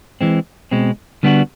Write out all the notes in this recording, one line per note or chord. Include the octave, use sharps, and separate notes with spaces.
E3 G#3 C4
B2 G#3 C4
D3 G3 B3 D4 F#4